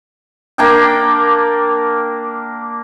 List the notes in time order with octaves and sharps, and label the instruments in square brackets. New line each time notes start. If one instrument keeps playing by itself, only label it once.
[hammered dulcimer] A#3 D4 G5